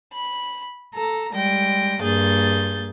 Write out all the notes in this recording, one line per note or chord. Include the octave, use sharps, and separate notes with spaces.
B5
A4 A#5
G3 G#3 G5 A#6
G2 A#3 G#4 G6 A6